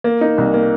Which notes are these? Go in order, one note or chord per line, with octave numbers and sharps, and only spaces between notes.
A#3
D#4
C2
A#3